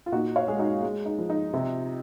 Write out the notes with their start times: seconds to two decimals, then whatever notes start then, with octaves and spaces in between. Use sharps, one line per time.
0.06 F4
0.12 A#2 D#4 F#4
0.36 C#5 F5
0.48 G#3 G#4
0.59 D#4 F#4
0.82 G#3
1.06 D#4
1.18 F3
1.30 D#4
1.54 C3